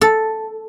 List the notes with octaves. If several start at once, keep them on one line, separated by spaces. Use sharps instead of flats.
A4